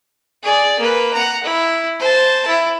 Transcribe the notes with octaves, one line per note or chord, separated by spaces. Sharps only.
G#4 D5
A#3 B4
F#5 A#5
E4
C5 A5
E4